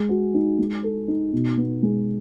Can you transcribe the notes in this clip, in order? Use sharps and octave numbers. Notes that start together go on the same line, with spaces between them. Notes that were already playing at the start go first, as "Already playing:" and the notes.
Already playing: G#3
F#4
D#4
G#3
A4
D#4
B2
B3
G#3